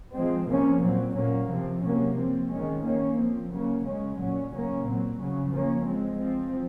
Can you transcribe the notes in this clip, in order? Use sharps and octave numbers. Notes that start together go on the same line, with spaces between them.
F3 G#3 C4
C3 F3 A#3 C#4
A#2 F#3 C4
A#2 F#3 A#3 C#4
C3 F3 C4
C3 F#3 A#3 C#4
F3 C4
D#3 G#3 C#4
D#3 A#3 C#4
F3 C4
C#3 F#3 A#3 C#4
C#3 G#3 C#4
A#2 F#3 C#4
C#3 F#3 A#3 C#4
A#2 F#3 C4
C#3 F#3 C#4
F3 A#3 C#4
F3 G#3 C4
F3 C4